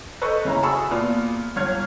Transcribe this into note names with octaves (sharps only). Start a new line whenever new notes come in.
A4 B4 C5 D#5 C#6
C#3 C#4 E4 A#5
F#4 G#4 A5 B5 C#6 E6
A#2 B3 F4 F6
G1 C#5 F6 G#6